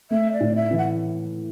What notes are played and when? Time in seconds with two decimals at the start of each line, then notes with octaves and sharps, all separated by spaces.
0.11 A3 E5
0.33 D5
0.41 A2
0.56 E5
0.71 E3
0.78 F#5